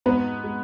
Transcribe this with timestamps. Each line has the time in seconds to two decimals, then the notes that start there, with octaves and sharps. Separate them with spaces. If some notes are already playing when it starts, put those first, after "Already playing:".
0.06 G#2 B3 B4
0.44 G#3